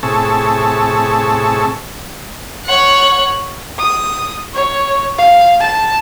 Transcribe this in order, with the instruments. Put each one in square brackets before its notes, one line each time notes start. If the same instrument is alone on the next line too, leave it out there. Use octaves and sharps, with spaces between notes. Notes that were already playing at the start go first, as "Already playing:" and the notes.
[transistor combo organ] A2 C3 G#4 A5 C#6 E6
[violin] C#5 F#5
[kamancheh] D#6
C#5
F5
A5